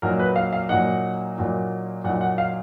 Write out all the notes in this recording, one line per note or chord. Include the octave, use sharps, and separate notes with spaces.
A#2 F#3 A#3 D#4 A#4
B4
F5
F5
A#2 F#3 A#3 D#4 F#5
A#2 F#3 A#3 D#4
A#2 F#3 A#3 D#4 F#5
F#5
F5